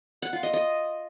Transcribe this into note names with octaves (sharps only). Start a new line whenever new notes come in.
F#5
F4
D#5
D#5